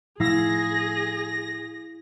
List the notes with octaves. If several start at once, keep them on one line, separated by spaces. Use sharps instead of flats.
A2 F3 A3 E4 G#4 F5 E6 A#6